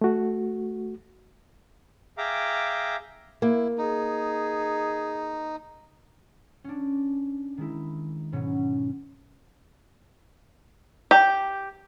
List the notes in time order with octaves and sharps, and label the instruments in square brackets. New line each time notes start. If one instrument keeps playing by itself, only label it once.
[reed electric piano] A3 F#4
[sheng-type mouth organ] G#4 E5 F5 G5 A#5 D6
[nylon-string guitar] A#3 [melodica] E4
[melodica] D#4 [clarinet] G#4
[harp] C#4 D4
D#3 G#3 E4
G#2 B2 F#3 C#4
[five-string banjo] G4